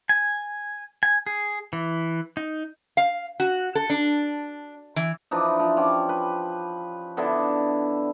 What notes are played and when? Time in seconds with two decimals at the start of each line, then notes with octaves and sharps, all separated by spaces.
0.09 G#5
1.03 G#5
1.26 G#4
1.73 E3
2.37 D#4
2.97 F5
3.40 F#4
3.75 A4
3.90 D4
4.96 E3
5.31 E3 F3 D4 D#4
5.59 F3 E4
5.77 F3 C#4 G4
6.09 B4
7.17 D3 B3 E4